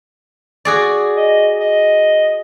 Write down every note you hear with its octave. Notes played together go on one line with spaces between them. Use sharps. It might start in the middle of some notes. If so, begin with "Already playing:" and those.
F#4 G#4 D5
D#5
D#5